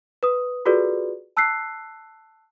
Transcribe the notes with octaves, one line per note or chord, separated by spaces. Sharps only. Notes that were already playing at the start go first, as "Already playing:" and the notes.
B4 D#6
F4 F#4 G#4 A4 B4 D5
A5 E6 F#6 B6 C7